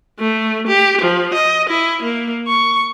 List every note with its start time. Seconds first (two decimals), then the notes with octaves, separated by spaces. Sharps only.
0.19 A3
0.67 G4
1.01 F3
1.33 D#5
1.69 E4
2.03 A#3
2.48 C#6